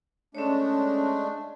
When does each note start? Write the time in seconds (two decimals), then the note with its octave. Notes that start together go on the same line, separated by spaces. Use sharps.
0.35 G#3 A3 C#4 D4 C#5